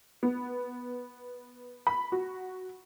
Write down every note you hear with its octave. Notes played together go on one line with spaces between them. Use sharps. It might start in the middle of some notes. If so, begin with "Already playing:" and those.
B3
B5
F#4